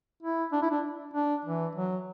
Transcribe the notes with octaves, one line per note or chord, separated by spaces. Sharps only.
E4
D4
E4
D4
D4
E3
F#3